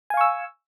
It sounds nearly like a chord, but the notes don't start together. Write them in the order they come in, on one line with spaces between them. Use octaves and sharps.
G#5 F5 C#6 E6